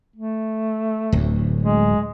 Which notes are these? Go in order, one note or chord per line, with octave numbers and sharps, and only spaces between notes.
A3
D1 D2
G#3